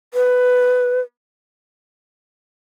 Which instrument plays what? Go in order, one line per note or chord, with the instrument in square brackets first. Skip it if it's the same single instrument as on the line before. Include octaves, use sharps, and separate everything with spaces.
[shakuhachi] B4